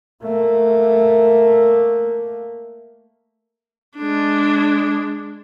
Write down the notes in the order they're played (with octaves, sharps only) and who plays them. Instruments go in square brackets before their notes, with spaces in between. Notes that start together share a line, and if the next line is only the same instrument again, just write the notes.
[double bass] A3 A#3
[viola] G#3 D4